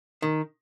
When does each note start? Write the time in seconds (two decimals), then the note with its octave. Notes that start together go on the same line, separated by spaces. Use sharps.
0.22 D#3